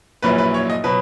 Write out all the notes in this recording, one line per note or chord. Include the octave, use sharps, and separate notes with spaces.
A#1 A#2 F#3 C#4 E4 B4
B4
C#5
D#5
B2 F#3 B4